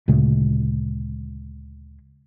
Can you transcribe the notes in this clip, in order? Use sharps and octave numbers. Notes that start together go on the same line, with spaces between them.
D2 A#2 C#3 G#3